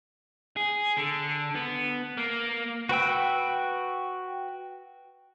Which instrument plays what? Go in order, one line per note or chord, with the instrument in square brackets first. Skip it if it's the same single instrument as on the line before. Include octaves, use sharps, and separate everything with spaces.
[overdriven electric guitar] G#4
D3
B3
A#3
[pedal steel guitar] F#4 B4 G5 E6